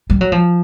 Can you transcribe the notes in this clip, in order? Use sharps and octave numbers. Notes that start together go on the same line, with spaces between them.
G3
F#3
F3